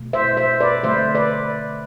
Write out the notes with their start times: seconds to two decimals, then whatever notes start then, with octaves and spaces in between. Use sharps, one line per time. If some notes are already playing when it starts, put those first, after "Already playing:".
Already playing: B2 A3
0.13 C5 E5
0.37 C5 E5
0.60 B4 D5
0.84 D3 A3 C5 E5
1.15 B4 D5